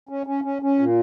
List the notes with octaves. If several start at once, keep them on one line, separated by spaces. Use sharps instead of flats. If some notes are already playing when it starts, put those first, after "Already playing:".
C#4
C#4
C#4
C#4
A#2